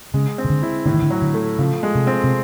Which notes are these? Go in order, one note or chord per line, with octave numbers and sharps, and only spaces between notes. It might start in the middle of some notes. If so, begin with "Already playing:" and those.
C#3 G#3
C4
C#3
D3
E4
A2 D3
D#3
D3
F#3
D3
A3
C#3 F3
G#3
C3
C4
C3